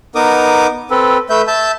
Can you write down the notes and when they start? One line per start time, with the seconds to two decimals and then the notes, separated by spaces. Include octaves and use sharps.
0.15 B3 D#4 A#4 D6 D#6
0.90 C4 A4 B4
1.30 A3 B4 E5 G6
1.47 E5 A5 G6